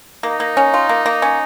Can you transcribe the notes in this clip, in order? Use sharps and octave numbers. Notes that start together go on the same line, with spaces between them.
A#3 D#4
A#3
C#4
F4
A#3
A#3
C#4